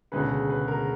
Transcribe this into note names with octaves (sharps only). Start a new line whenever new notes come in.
E1 D2 C#3 B4
B4
A#4